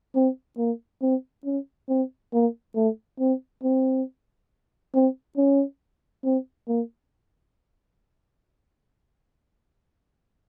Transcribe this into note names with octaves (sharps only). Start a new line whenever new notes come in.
C4
A#3
C4
C#4
C4
A#3
A3
C4
C4
C4
C#4
C4
A#3